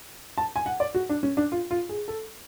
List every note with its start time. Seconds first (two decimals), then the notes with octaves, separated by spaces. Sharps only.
0.38 A5
0.56 G#5
0.66 F#5
0.80 D5
0.95 F#4
1.09 D4
1.23 C#4
1.37 D4
1.52 F4
1.71 F4
1.89 G#4
2.08 A4